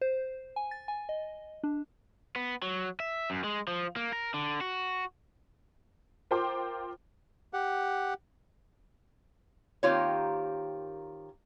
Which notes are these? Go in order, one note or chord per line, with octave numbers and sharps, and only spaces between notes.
C5
G#5
A6
G#5
D#5
D4
B3
F#3
E5
F#2
G#3
F3
A#3
A#4
D3
F#4
F4 A#4 C5 G5 C6 D6
G4 F#5
D#3 A#3 C4 F4 G4 C#5